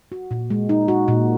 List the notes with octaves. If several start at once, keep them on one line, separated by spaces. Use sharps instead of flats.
F#4
A#2
G#3
D#4
F#4
A#2